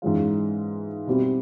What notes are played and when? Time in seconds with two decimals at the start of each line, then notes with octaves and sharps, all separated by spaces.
0.02 G#2 E3 G#3 C#4 F4
1.07 B2 G3 C4 E4